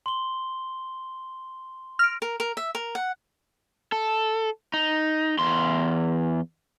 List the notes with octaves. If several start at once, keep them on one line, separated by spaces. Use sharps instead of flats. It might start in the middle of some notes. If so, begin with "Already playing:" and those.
C6 G7
F6 A#6 D7
A#4
A#4
E5
A#4
F#5
A4
D#4
E2 C6